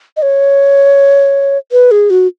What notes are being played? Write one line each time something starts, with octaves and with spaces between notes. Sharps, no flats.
D#5
C#5
B4
G#4
F#4